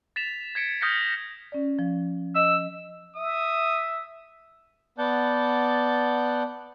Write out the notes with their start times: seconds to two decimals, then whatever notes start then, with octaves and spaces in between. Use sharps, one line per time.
0.16 A6 B6 E7 F7
0.55 G#6 B6 C#7 D7
0.81 D#6 F6 G6 A#6 B6 C#7
1.52 C#4 D5
1.79 F3
2.35 D#5 E6
3.16 E5 D#6
4.98 B3 D5 F#5 A5 G6